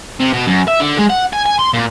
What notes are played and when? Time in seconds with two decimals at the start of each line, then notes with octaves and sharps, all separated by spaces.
0.20 C3
0.33 B2
0.47 F#2
0.68 E5
0.80 D3
0.99 G#3
1.10 F#5
1.33 G#5
1.46 G#5
1.59 C6
1.74 A#2